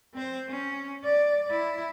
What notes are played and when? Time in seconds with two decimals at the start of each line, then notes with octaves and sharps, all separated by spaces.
0.14 C4 C5
0.49 C#4
1.04 D5
1.51 E4